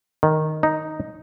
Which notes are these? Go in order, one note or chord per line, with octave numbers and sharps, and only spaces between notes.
D#3
D#4